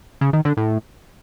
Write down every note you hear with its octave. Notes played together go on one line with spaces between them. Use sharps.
C#3
D#3
D3
A2